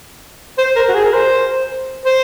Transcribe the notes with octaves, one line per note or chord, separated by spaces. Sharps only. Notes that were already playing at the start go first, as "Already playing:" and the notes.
C5
A#4
F#4
G#4
A#4
C5
C5